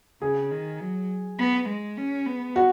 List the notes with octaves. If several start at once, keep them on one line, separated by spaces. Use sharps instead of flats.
C#3 G#4
D#3
F#3
B3
G#3
C#4
B3
F#4